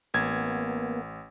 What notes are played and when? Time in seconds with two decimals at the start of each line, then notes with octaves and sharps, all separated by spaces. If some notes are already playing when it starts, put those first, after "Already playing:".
0.14 A1 A#3 B3 G#6